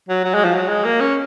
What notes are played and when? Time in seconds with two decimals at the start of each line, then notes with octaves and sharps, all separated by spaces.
0.09 F#3
0.24 F#3
0.34 G#3
0.45 F3
0.54 F#3
0.69 G#3
0.85 A#3
1.00 C#4